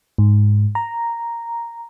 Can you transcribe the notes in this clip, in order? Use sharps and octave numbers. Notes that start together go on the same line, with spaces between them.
G#2
A#5